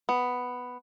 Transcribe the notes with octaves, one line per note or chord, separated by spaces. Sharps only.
B3